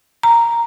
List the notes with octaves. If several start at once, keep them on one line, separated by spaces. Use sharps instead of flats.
A#5